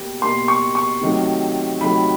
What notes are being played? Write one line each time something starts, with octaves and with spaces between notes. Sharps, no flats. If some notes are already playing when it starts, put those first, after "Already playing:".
Already playing: B2 G3 A#3
B2 G3 A#3 C6
C#6
C#6
C3 D#3 F#3 A3
C3 D#3 F#3 A3 B5